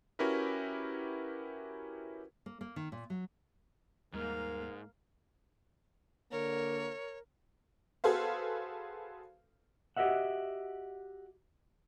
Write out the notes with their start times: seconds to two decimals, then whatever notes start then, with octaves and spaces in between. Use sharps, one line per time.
0.19 C#4 E4 F#4 G4 A#4 B4
2.46 A#3
2.61 A#3
2.76 D#3
2.92 A#2
3.10 F#3
4.13 D#2 G#2 G3 A#3 A#4 F5
6.31 D3 A#3 A#4 C#5
8.04 F#4 G#4 A4 B4 C5 F5
9.97 F#4 G4 A4 D#5 E5 F#5